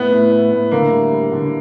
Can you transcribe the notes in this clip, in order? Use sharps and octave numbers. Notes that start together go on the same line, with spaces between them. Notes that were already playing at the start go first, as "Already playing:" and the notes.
Already playing: A2 B3
A2
A2
A2
D3 A#3
G3
G3
D3